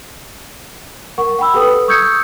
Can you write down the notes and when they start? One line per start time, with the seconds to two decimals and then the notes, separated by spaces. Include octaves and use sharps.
1.18 A#4 F#5 C#6
1.38 F#5 G5 B5 E6
1.54 G4 A4 B4 D#6
1.88 C#6 D#6 E6 G6 G#6 C#7